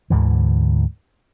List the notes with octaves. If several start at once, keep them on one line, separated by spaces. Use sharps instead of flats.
D2 G#2 D3 E3